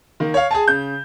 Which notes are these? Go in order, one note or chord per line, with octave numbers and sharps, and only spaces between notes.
D#3 A#3
C#5 F5
G#4 G#5 A5
C#3 G6